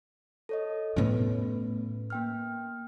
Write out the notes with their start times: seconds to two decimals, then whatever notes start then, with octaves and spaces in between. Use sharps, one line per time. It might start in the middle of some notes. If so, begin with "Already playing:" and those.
0.49 A4 C#5 D#5
0.96 A2 A3 B3 C#4 B4
2.10 A#3 G5 F6